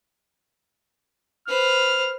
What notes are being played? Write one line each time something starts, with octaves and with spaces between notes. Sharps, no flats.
B4 C5 F6